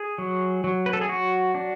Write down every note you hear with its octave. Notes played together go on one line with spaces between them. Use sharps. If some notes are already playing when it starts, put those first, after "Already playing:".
Already playing: G#4
F#3
F#3
B4
A4
G#4
F#3 F#4
D4